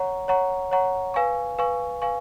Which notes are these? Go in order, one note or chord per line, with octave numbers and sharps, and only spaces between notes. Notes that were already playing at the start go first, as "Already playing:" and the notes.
Already playing: C#5 F#5 A#5 C#6
C#5 F#5 A#5 C#6
C#5 F#5 A#5 C#6
B4 F5 G#5 C#6
B4 F5 G#5 C#6
B4 F5 G#5 C#6